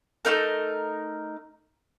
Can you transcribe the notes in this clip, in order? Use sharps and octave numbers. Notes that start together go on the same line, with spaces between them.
A3 C4 D#4 A#4